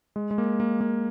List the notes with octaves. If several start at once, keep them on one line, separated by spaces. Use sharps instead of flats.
G#3
G#3
A#3
A#3
A#3